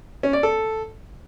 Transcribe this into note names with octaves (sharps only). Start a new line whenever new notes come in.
C#4
D5
A4